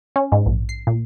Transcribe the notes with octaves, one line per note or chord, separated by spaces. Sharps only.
C#4
G#2
A#1
C7
A#2